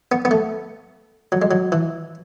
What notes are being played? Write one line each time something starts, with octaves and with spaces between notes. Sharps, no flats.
B3
B3
A3
F#3
G#3
F#3
E3